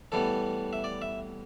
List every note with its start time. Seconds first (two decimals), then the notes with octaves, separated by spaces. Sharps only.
0.12 A2 E3 G3 B3 A4
0.73 E5
0.84 D5
1.02 E5